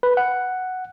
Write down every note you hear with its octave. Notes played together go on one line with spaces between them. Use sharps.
B4
F#5